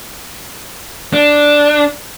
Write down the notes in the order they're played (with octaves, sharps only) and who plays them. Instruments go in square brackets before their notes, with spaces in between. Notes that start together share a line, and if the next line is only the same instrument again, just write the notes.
[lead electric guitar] D4